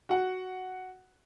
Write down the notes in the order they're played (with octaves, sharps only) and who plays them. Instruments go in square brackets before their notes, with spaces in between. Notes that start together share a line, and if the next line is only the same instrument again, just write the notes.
[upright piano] F#4 F#5